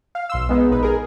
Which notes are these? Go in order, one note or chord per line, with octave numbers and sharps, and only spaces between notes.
F5
B1 C6 E6
G#3 B3 D#4
A#1 D#4 B4
G#4 A#4